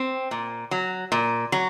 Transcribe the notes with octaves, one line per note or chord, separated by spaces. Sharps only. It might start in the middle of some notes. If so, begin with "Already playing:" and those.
Already playing: C4
A#2
F#3
A#2
F#3